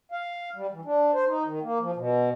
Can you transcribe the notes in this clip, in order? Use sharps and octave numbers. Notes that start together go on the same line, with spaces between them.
F5
G3
E3
D4
C5
D#4
D#3
A#3
F3
B2